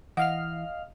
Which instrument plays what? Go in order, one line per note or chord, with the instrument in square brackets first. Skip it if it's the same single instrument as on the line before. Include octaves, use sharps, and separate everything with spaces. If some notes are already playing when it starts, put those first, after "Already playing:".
[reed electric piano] E3 E4 [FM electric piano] D#5 F5 F6 [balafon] F#5